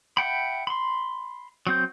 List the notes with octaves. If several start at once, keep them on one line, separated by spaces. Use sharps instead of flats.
E5 F#5 G5 B5
B5 C6
F#3 C4 G6